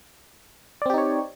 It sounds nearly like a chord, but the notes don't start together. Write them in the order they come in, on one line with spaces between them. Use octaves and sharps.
D5 C4 G4 D#4 C#5